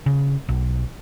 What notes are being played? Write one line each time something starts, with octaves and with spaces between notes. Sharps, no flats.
C#3
B1